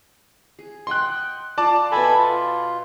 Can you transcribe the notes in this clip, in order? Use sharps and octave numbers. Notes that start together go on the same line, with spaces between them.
G#4
D#5 F#5 G5 C6 F#6
F4 D5 A5 D6
B2 A4 E5 G5 G#5 B5
F4